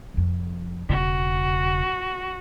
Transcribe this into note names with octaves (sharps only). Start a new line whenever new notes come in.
F1 F2
E1 C#3 F#4